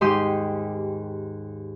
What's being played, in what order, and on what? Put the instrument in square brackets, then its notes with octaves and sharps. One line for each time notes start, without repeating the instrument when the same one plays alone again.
[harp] D#2 G#2 G4 C6 D#6 G6